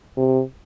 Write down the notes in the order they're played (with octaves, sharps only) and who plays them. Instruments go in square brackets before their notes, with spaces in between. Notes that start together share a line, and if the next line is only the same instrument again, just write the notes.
[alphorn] C3